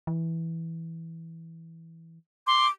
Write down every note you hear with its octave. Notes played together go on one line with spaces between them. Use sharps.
E3
C6 D6